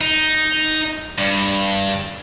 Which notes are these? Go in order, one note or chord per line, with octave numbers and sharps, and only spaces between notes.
D#4
G2